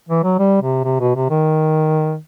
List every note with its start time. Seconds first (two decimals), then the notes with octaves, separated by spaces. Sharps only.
0.09 E3
0.24 F#3
0.39 G3
0.62 C3
0.85 C3
1.00 B2
1.16 C3
1.30 D#3